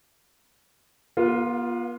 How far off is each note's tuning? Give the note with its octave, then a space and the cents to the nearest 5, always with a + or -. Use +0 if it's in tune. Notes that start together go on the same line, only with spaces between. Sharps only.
B3 -45 F4 +0